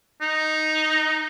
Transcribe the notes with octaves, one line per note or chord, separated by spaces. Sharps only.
D#4